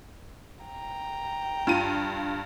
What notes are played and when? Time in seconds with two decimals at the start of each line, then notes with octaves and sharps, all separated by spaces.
0.64 G5 A#5
1.67 G2 F4 D#7